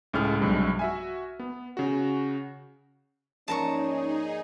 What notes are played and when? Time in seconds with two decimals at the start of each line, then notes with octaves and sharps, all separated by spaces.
0.13 C#2 A2 G#4 F6
0.39 B1 G2 C3 G#3
0.79 F#4 E5 G#5
1.39 B3
1.77 C#3 F#4
3.48 A#1 G#2 C#4 D#4 G#4 A5 A#5 C#6